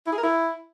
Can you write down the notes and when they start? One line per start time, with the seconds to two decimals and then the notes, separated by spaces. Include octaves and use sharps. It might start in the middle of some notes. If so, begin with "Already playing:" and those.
0.07 E4
0.12 G#4
0.18 A#4
0.23 E4